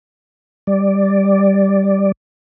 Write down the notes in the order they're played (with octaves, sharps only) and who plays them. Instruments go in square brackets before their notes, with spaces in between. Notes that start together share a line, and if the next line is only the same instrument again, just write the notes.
[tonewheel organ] G3 D5